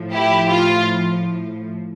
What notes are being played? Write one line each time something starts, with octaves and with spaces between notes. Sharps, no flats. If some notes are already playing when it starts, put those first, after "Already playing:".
Already playing: A2 F3
E4 G4
F4